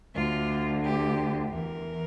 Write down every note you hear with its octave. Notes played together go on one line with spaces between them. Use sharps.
D2 D3 F4
G4
E2 E3 A#4